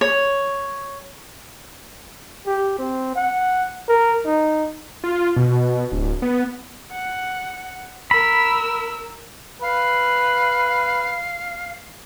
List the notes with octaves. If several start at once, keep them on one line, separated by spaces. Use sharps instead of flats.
C#5
G4
C4
F#5
A#4
D#4
F4
B2
D1
B3
F#5
A#4 B5 E6
B4 F5